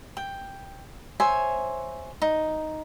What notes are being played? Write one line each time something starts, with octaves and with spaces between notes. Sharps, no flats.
G5
C5 C#5 E5 G#5
D#4